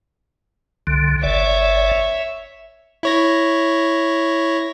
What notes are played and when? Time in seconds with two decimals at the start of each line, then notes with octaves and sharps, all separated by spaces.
0.87 C2 D3
1.23 G1 C#5 D5 E5
3.03 E4 C#5 A#6